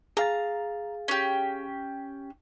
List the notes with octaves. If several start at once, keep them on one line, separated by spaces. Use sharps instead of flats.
G#4 F5 A#5 A6
C#4 G4